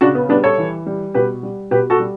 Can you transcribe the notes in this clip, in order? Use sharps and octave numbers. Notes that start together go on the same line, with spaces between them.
C#3 D4 F#4
B3
G3 B3 D4
A4 C#5
E3
G3
B2 G4 B4
G3
B2 G4 B4
F#4 A4
G3